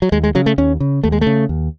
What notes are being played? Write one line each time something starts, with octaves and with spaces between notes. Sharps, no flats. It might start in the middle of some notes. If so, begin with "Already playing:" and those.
F#3
D#2 G#3
G#3
C#3 F#3
A3
D#2 C#4
C#3
D#2 A3
G#3
A3
C#3
D#2